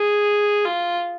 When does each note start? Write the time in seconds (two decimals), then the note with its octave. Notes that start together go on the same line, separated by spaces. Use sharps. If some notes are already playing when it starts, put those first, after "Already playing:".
Already playing: G#4
0.65 F4